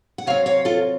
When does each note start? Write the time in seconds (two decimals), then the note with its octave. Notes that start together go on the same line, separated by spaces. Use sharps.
0.18 F#5
0.27 C3 F#3 C4 C#5 F5
0.46 C#5 F5
0.65 F4 A4